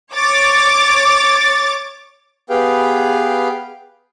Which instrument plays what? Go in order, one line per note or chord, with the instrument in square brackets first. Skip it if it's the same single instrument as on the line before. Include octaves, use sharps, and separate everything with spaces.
[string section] C#5 D6 A6
[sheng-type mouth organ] B3 G4 G#4 B4 F5 G5